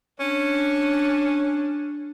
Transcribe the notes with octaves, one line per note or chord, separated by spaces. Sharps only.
C#4 D4